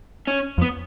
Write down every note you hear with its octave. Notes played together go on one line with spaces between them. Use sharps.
C#4
F2
B3